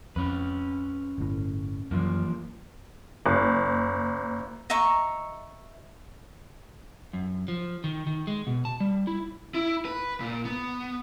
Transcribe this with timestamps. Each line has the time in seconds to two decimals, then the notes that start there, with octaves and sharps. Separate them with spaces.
0.16 F2 C#4 B4
1.18 G1 A2
1.91 F#2 E3 F3 A#3
3.26 F#1
4.70 D#5 E5 A#5 C#6
7.13 F#2
7.48 F3
7.84 D#3
8.07 D#3
8.27 G#3
8.47 B2
8.65 A5
8.80 G3
9.07 E4
9.55 E4
9.85 B4
10.20 A#2
10.45 B3